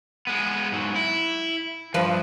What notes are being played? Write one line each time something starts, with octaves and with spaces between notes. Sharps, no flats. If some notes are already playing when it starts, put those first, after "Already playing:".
G#3 B3
G#2 F#3
E4
G2 F3 B4